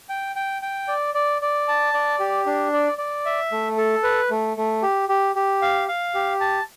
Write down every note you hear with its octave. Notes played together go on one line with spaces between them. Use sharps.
G5
G5
G5
D5
D5
D5
A5
D5
G4
D4
D5
D5
E5
A3
A4
B4
A3
A3
G4
G4
G4
F5
F5
G4
A5